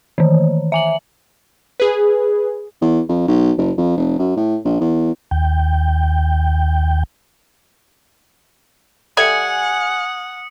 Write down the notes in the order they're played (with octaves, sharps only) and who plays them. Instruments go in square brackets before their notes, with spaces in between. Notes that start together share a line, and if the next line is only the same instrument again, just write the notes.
[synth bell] D#3 E3
E5 G#5 F#7
[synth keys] G#4 B4
[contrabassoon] E2
F2
B1
F#1
F2
F1
F#2
A2
A#1
E2
[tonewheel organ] D#2 G5
[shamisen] G3 A4 E5 [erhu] F#5 [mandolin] G#5 [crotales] D#6 C#7